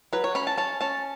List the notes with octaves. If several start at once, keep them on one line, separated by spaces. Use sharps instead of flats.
F#3 B4
C#5
C#4 B5
A5
C#4 A5
C#4 A5